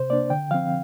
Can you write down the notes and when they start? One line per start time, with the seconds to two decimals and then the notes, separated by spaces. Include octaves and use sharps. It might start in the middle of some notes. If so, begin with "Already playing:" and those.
Already playing: C3 C5
0.10 A#3 D4 D5
0.30 D3 G5
0.51 F3 C4 F5